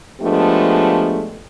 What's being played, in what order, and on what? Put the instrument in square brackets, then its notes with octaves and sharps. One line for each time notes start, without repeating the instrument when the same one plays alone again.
[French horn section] F3 G#3 A3 B3 D4 G4